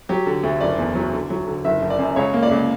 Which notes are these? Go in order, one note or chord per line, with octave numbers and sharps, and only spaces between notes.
F#3 G4
D3
D2
F#1 D5
E2
F#3
D3
F#3
D3
F#1 E5
F#1
D5
F#2
C#2 C#5
A#3
D5
C#2